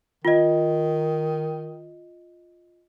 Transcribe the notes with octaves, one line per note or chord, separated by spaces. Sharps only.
D#3 F4 D#5